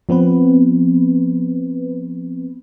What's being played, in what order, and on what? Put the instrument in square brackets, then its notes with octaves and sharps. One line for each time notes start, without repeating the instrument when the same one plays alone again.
[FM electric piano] F3 B3 C4 B4